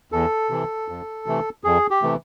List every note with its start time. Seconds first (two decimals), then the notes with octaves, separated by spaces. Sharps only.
0.12 E2 A4
0.51 C3 E3
0.88 F2
1.26 C3 E3 A3
1.64 F2 G#4
1.91 G4
2.02 C3 E3 A3